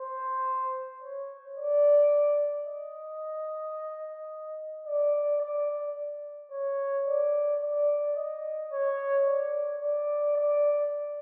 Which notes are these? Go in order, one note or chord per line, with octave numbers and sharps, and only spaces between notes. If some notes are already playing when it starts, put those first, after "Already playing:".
Already playing: C5
C#5
D5
D#5
D5
D5
C#5
D5
D5
D#5
C#5
D5
D5
D5